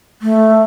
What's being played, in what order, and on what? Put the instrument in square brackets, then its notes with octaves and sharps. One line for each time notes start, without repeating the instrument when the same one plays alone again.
[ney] A3